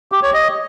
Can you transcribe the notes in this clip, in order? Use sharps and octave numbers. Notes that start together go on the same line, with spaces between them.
G4
C#5
D#5